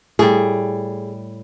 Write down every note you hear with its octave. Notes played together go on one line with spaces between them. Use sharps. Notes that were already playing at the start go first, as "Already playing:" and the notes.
A2 G3 G#4